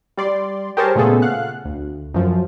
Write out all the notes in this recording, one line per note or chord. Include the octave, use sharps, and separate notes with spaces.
G3 D5 C6
G4 G#4 A#4 C5 C#5 A5
A#2 C#3 A3 B3 G#4 A4
F5 F#5 F#6
D2
F#2 F3